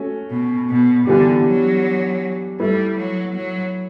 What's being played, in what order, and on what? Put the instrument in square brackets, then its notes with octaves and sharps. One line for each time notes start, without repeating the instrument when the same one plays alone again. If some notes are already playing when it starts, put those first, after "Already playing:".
Already playing: [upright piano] A3 C#4 F#4
[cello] B2
B2
[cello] D3 [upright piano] E3 G3 B3 D4 G4
[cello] F#3
[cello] G3 [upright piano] A3 E4 B4
[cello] F#3
F#3